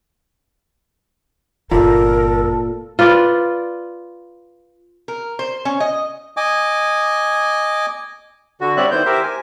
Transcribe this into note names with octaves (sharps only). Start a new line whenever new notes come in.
G1 G2 A#2 A4 A#4
F4 B4 D5
A#4
C5
C#4
D#5
D#5 G#5 D6
D3 F#4
G3 C4 C#5 D5 E5 F#6
D#3 B3 E4 C5 G6
G4 A#4 C5 E5
G#5